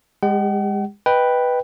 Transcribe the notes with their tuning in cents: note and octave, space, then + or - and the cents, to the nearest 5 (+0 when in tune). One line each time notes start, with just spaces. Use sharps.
G#3 -30 G4 +30 F#5 +45
B4 +0 D#5 +0 G5 +0